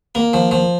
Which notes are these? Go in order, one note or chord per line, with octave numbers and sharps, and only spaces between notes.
A#3
F3
F3